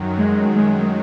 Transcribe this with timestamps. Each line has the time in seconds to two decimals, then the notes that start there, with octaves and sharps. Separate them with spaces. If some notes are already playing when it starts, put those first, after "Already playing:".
Already playing: F#2 D#3 F#3
0.18 G#3
0.55 G#3